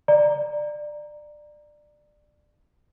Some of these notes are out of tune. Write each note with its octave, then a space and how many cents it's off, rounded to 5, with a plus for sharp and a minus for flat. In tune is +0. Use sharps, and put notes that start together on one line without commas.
D5 +20 A#5 +0